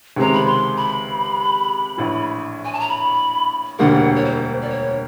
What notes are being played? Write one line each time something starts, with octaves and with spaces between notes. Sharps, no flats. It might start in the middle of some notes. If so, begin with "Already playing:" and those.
C#2 C3 D#3 G#3 C4 A#5
B5
C6
B5
A#1 A2 E3
G#5
A5
A#5
B5
E1 D2 D3 G3 A#3 F#5
C#5
C5
D5
C#5